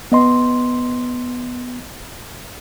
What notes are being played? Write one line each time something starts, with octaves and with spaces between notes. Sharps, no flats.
B3 D#5 C6